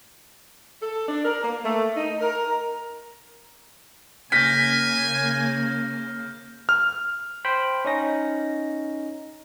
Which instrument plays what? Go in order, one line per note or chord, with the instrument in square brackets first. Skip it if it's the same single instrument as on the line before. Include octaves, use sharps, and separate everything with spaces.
[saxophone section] A4
D4
A#4
A#3
A3
D#4
A#4
[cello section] C#3 A#3 [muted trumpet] G#5 [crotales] F6 G6 A#6 [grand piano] B6
[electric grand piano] F6
[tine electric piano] C5 G5 B5
C#4 D#4 A#6